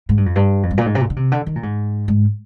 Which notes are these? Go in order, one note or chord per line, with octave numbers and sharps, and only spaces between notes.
G#2
G2
F2
G2
F2
G2
A#2
G#2
C3
A#2
D3
C3
D3
D#3
A#2
G#2
G#2